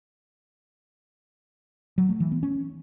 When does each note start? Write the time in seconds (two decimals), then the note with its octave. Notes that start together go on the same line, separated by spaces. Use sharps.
1.98 F#3
2.09 A3
2.20 E3
2.31 B3
2.43 C#4